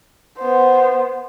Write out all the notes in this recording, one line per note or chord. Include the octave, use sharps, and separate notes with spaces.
B3 C5